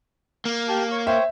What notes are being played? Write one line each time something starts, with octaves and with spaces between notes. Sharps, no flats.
A#3
G4 A5
C#5 C#6
C5 C#5 E5 G5